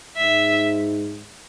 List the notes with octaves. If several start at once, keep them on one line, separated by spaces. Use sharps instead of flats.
G#2 E5